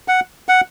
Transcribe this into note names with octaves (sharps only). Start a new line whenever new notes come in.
F#5
F#5